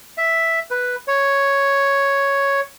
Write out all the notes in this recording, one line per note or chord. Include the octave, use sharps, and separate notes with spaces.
E5
B4
C#5